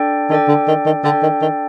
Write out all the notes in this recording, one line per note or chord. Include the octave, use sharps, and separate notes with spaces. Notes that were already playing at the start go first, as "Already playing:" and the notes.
Already playing: D4 A4 D5 G5
D#3 D4 A4 D5 G5
D3
D#3
D#3
D3 D4 A4 D5 G5
D#3
D#3